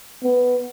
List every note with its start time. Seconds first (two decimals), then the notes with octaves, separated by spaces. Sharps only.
0.23 B3